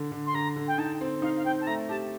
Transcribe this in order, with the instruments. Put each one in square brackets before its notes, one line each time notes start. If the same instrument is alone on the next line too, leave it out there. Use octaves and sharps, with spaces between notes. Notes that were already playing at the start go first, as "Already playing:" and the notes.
Already playing: [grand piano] D3
D3
[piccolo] C6
[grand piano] D3 [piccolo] A#5
[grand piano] D3
[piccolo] G5
[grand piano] D#4 [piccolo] A5
[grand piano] C4
[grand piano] D#4 [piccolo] F5
[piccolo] F5
[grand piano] C4 [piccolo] G5
[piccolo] A5
[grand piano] A3 [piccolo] A#5
[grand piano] G4 [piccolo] A5